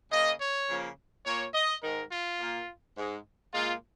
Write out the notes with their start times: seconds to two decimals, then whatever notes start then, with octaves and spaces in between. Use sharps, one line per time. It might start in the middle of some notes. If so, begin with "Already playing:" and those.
0.11 C#3 A#3 D#5
0.40 C#5
0.69 C#3 F3 A#3
1.25 A#2 A#3 C#5
1.54 D#5
1.82 G#2 D#3 G#3 A#4
2.11 F4
2.39 A#2 A#3
2.96 G#2 G#3
3.54 A#2 G#3 F4